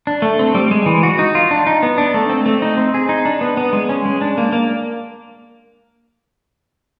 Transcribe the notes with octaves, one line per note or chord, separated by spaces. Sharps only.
D4
A3
C4
G3
G#3
E3
F#4
D#4
F4
D4
D#4
B3
D4
A3
C4
A3
D#4
C4
G#4
D#4
D4
B3
B3
G#3
C#4
G#3
D4
A#3
A#3